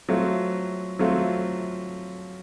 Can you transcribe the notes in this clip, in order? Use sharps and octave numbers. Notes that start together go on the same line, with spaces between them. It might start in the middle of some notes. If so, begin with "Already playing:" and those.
F#3 A3 C4 F4
F#3 A3 C4 F4